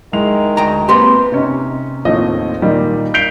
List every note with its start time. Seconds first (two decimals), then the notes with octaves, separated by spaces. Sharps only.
0.13 D#3 G#3 E4 F7
0.57 D2 G5 A#5
0.89 A#3 C4 G4 B4 C6
1.32 C3 C#4 D#4
2.05 D#2 A2 F3 A3 C4 D#5
2.62 A#2 D#3 G3 D#4
3.14 G6 B6 C7 D7 F7 G7